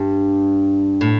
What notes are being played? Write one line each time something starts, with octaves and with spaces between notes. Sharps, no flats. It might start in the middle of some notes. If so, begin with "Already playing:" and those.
Already playing: G2
A2